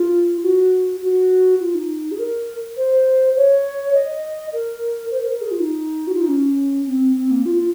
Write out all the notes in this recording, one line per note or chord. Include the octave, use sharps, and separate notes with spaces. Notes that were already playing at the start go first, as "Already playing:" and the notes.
Already playing: F4
F#4
F#4
F4
D#4
G#4
A#4
C5
C#5
D#5
A#4
C5
A#4
A#4
G#4
F4
D#4
F#4
F4
D#4
C#4
C4
C4
A#3
F4
F4